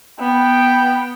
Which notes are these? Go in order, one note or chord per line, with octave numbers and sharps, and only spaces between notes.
B3 G5